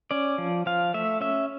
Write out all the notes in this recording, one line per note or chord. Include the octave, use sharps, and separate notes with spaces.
C#4 D5
F3
F3 F5
A3 E5
C#4 E5